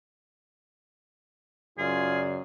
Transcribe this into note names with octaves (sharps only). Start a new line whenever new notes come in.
F#2 C#3 F4 G#4 D5